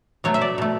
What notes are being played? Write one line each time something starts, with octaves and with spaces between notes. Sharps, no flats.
B2 F#3 A3 C#5
E5
D5
B2 A3